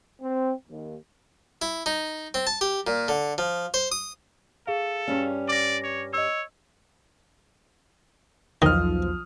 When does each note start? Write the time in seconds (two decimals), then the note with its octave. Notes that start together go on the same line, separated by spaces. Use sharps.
0.22 C4
0.69 D#2
1.62 E4
1.86 D#4
2.34 C4
2.47 A5
2.61 G4
2.87 A#2
3.08 D3
3.38 F3
3.74 C5
3.92 D#6
4.67 G#4 A4 F5
5.08 G2 G3 C#4
5.48 D5 D6 A#6
5.84 C#5
6.13 C#5 D#5 E6
8.62 B1 E2 D#3 F3 D#6 F6